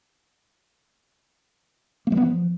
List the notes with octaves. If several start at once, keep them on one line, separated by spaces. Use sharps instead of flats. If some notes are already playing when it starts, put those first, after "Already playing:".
A#3
G3
B3
F3